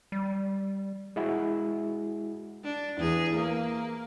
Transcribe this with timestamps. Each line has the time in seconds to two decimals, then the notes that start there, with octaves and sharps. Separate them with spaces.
0.12 G3
1.16 G#3 E4 F#4 G#4
2.64 D4
2.98 E2 G#4
3.35 A#3